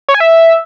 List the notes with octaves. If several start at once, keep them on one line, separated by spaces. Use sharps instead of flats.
C#5
G#5
E5